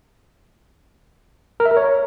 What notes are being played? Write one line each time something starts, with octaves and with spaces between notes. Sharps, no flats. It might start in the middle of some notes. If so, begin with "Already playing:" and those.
A#4
E5
A#4
C#5